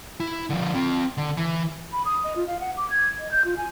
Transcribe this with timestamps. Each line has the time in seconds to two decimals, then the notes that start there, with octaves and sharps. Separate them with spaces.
0.20 E4
0.50 D3 F3
0.74 C4 F4
1.17 D3
1.37 E3
1.92 B5
2.05 D#6
2.24 D#5
2.36 F4
2.47 F5
2.60 F#5
2.77 D6
2.90 G#6
3.19 D#5
3.31 G6
3.45 F4
3.57 G#5